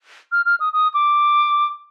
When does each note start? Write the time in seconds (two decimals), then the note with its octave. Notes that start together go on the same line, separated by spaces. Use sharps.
0.32 F6
0.46 F6
0.60 D#6
0.73 D#6
0.94 D6